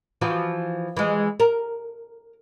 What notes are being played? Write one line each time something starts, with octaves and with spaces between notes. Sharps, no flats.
E3 F3 F#4
E3 G#3
A#4